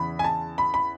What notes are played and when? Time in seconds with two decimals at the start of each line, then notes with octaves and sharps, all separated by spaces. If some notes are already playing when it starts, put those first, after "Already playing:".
Already playing: E2 C#3 E3 B5
0.19 G#5
0.24 A5
0.58 B5
0.74 B5